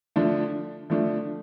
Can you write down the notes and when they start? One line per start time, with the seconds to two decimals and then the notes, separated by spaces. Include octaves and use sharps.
0.16 D3 F3 A3 D4
0.90 D3 F3 A3 D4